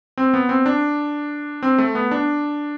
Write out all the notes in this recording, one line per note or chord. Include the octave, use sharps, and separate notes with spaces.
C4
B3
C4
D4
C4
A3
B3
D4